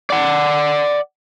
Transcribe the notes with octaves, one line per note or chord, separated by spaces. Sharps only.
D5 F#5